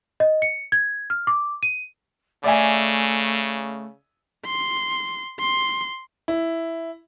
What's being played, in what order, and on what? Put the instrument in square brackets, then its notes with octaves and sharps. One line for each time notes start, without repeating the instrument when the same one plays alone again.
[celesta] D#5
C#7
G#6
F6
D6
D#7
[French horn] C#3 [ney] A3 [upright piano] D5 E5 G#5
[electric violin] C6
C6
[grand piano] E4